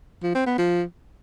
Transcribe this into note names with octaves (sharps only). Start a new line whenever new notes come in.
F3
C4
B3
F3